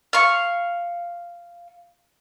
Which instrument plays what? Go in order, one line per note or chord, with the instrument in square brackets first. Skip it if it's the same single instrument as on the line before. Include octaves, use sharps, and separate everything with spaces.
[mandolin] F5 C#6